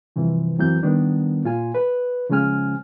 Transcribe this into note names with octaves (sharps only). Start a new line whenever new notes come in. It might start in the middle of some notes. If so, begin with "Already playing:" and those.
G2 C3 E3 F3
F#2 E3 F#3 C4 G6
D#3 G3 B3 D4
A#2 F4 G#5
B4
C#3 F3 G#3 C#4 G#5 F6